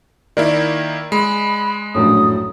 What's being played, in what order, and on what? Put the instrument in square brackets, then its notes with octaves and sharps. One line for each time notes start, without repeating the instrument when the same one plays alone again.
[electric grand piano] D#3 A#3 E4 [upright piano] D5
[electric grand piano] G#3 [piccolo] B5
[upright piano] A#1 F#2 A2 [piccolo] D#6